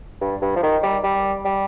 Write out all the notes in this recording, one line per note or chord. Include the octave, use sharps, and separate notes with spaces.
G2
G2
F3
D#3
G3
G3
G3